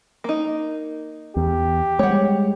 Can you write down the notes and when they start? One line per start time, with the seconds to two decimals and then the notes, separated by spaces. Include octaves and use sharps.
0.24 A#3 D#4
1.37 E2 G4
1.99 G3 G#3 C#5 F#5